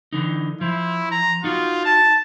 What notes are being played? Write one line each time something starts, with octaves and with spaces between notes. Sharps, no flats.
D3 E3 D#4
F3 E4
A#5
D#4 F4 F#4
A5